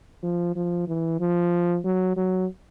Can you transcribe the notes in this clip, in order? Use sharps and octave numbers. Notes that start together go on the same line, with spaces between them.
F3
F3
E3
F3
F#3
F#3